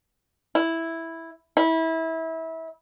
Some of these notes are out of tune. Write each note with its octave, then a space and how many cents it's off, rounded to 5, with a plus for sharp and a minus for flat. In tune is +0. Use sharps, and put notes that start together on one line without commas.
E4 -5
E4 -25